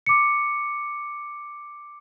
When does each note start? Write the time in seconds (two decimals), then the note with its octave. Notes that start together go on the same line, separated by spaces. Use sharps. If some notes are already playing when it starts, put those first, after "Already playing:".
0.06 D6 C#7